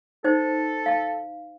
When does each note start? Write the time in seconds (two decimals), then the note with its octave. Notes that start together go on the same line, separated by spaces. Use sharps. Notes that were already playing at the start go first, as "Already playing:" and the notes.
0.24 D#4 A4 C5
0.86 F5 A5